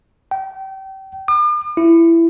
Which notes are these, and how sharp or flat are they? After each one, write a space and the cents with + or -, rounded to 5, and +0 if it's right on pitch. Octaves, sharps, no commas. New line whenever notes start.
G5 -30
D6 +45
E4 +15